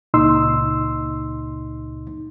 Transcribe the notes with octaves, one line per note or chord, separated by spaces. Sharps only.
C#2 A#2 D#4 C6 E6